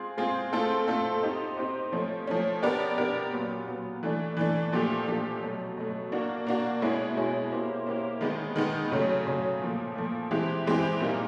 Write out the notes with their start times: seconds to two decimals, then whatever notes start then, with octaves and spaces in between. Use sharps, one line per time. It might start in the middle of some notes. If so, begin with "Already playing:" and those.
Already playing: G#3 C4 F4 G#4
0.18 G#3 C4 F4 G#4
0.53 A3 C4 F4 A4
0.88 A3 C4 F4 A4
1.22 C4 D#4 G4 C5 D#5
1.57 C4 D#4 G4 C5 D#5
1.92 F3 A3 C#4
2.27 F3 A3 C#4
2.62 B3 D4 G4 A#4 D5
2.97 B3 D4 G4 A#4 D5
3.32 A#2 F#3 B3
3.67 A#2 F#3 B3
4.03 E3 A3 D4
4.37 E3 A3 D4
4.72 A#2 F3 A3 D4 G4
5.07 A#2 F3 A3 D4 G4
5.41 B2 F#3 A3
5.77 B2 F#3 A3
6.12 A#3 D4 F#4
6.47 A#3 D4 F#4
6.81 B2 G#3 C#4 E4 G#4
7.17 B2 G#3 C#4 E4 G#4
7.52 A#3 C#4 E4 G4 C5
7.86 A#3 C#4 E4 G4 C5
8.21 D#3 G#3 B3 D#4
8.56 D#3 G#3 B3 D#4
8.92 C#3 F#3 A3 C#4
9.27 C#3 F#3 A3 C#4
9.62 A#2 F3 A3
9.96 A#2 F3 A3
10.31 E3 G#3 C4 E4 G4
10.66 E3 G#3 C4 E4 G4
11.00 A#2 G3 A#3 D#4